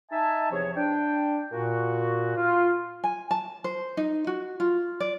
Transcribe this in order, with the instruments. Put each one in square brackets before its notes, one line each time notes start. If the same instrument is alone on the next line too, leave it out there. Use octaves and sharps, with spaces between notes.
[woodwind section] D#4 E5 G#5 A5
E2 C3 F3 G#4 C#5
D4 G5
A#2 F#4
F4
[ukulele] G#5
A5
C5
D#4
F#4
F4
D5